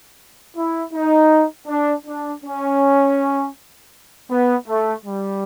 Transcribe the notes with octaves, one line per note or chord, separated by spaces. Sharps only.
E4
D#4
D4
D4
C#4
B3
A3
G3